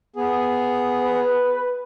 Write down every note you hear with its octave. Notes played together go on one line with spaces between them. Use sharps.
B3 G#4
B4